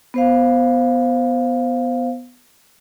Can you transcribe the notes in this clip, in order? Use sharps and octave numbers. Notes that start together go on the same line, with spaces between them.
B3 C5 F5